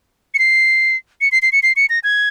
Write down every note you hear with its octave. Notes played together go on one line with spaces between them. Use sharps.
C#7
C7
C#7
C7
C7
C#7
C7
C#7
A#6
G#6